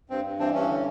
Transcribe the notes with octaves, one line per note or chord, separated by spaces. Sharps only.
G2 C4
G2
E3 C4 D4
G2 C#4
D3